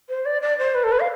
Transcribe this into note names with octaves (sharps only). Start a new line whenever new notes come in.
C5
D5
D5
C5
B4
A4
B4
F5